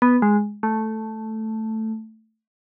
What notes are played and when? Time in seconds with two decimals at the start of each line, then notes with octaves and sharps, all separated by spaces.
0.02 B3
0.22 G#3
0.63 A3